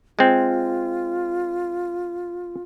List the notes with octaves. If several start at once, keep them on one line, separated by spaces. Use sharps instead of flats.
G#3 C4 F4